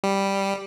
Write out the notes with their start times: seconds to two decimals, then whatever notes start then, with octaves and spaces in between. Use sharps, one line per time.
0.04 G3